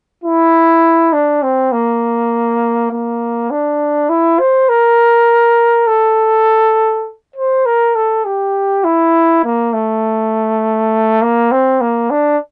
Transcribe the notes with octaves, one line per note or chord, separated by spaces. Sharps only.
E4
D4
C4
A#3
A#3
D4
E4
C5
A#4
A4
C5
A#4
A4
G4
E4
A#3
A3
A#3
C4
A#3
D4